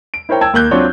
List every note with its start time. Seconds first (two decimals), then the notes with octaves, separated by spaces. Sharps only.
0.14 D7
0.29 E4 A#4 C5 C#5 G5
0.41 G5 A5 E6 G#6
0.53 D#2 A#3 F#6 G6
0.71 F#3 C4 D4 F4 C#5